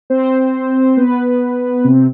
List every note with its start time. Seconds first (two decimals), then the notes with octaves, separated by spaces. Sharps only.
0.10 C4 C5
0.97 B3 B4
1.84 C3 C4